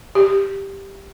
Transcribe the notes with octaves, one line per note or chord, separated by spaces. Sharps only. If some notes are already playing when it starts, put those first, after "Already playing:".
G4